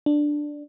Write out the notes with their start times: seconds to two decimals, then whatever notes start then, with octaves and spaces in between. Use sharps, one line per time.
0.06 D4